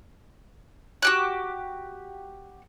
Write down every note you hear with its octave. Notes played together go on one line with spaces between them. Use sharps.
F#4 G4 F#6